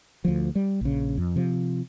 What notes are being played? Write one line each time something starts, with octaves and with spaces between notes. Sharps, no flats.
D2 F3
G3
A#1 C#3
F2
C3 F3